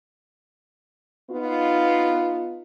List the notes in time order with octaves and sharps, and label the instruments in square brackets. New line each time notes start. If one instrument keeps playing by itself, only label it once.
[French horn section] B3 D#4 F4